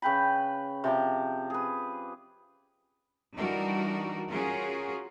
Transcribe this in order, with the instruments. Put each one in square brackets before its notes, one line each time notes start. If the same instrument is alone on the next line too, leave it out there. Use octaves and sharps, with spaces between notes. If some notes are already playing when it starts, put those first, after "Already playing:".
[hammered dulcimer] C#3 B4 G5 B5
C3 F3 D5
G#4 B4
[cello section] E3 G3 D4 D#4 F#4 A#4
C#4 F4 F#4 G#4 A#4